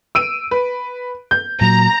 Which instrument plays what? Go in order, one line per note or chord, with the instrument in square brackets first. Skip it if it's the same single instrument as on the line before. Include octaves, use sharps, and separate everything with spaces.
[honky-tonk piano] E6 D7 D#7
B4
G6
[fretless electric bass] A#2 F#3 [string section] A#5